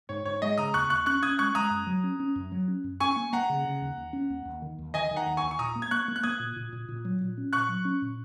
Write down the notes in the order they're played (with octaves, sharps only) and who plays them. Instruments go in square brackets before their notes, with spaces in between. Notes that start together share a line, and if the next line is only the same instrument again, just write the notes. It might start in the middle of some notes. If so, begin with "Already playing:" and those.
[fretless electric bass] G#2 [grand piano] C#5
[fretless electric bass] G#2 [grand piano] C#5
[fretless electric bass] G#3 [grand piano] D#5
[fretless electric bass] C#3 [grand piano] A#5 D#6
[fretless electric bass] D#2 [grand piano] C#6 F#6
[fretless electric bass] D#2 [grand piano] C#6 F#6
[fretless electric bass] C#4 [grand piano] C#6 F#6
[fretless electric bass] C#4 [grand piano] D#6 G#6
[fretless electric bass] G#3 [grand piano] C#6 F#6
[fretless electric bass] G#3 [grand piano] A#5 D#6
[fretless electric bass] F#2
F#3
C#4
C#4
F#2
F#3
C#4
F#2
[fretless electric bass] C#4 [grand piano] G#5 C#6
[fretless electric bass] A#3
[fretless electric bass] A#3 [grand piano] F#5 A#5
[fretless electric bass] C#3
C#3
D#2
D#2
C#4
D#2
D#2
D#3
D#2
[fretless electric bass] D#3 [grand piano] D#5 G#5
[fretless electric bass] D#3
[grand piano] F#5 A#5
[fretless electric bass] D#2
[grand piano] G#5 C#6
[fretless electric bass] D#2
[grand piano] C#6
[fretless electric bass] A#2 [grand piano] A#5 D#6
[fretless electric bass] A#3
[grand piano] G#6
[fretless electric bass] A#3 [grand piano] C#6 F#6
[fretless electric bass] A#3
[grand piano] F#6
[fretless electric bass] A#3 [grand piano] D#6 G#6
[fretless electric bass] A#2
A#2
A#2
A#2
F#3
A#2
C#4
[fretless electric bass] A#2 [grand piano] C#6 F#6
[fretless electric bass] F#3
C#4
A#2